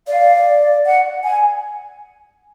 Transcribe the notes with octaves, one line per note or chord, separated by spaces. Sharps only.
D5 F5
F#5
G#5